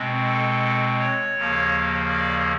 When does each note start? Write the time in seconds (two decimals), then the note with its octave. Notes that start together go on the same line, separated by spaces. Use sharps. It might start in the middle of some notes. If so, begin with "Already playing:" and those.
Already playing: B2 G#3 C4
0.25 A4
0.99 C#5
1.35 D#2 C#3 F3 A#3
2.09 D5